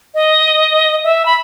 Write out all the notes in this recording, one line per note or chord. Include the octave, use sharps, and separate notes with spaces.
D#5
E5
B5